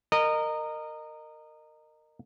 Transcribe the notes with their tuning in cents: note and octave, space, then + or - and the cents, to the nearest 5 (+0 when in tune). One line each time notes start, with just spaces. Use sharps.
A#4 -15 D#5 -20